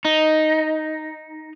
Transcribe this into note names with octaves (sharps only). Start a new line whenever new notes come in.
D#4